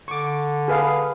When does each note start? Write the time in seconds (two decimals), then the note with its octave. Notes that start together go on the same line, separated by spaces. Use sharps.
0.08 D3 C#6 D6
0.68 G#4 B4 F5